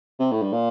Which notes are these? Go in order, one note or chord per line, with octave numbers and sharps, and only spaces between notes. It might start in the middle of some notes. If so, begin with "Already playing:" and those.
C3
A2
G2
A#2